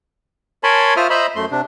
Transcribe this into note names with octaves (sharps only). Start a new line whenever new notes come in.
A#4 C#5 G#5 A5 B5 C6
F4 C5 E5 D#6 F6
C5 D#5 E5 A#5 B5
F#2 A3 C6
C3 D4